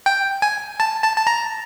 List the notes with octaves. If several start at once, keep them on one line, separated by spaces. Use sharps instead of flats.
G5
G#5
A5
A5
A5
A#5